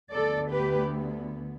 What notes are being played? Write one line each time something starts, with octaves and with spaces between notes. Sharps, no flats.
D2 D3 B3 A4 D5
G4 B4